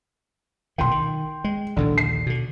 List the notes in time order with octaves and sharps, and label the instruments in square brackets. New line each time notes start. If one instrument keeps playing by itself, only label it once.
[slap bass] B1 A#2 D#3 [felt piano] G5 C6
[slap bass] D#3
G#3
[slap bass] A#1 D#2 A2 [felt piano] D3
[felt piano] C7
[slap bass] B2 D3